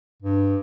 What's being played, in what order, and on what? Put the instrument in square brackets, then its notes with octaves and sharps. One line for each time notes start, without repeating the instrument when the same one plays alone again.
[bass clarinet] G2